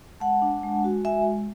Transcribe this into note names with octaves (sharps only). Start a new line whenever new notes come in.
G#3 F#5 A5
D4
G#3
F#4
G#3 E5 G#5